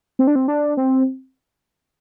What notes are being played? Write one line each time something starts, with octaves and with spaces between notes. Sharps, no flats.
C4
D4
C4
D4
C4